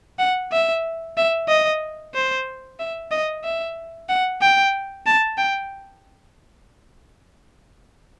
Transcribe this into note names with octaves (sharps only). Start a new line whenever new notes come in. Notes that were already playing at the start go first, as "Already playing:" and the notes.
F#5
E5
E5
D#5
C5
E5
D#5
E5
F#5
G5
A5
G5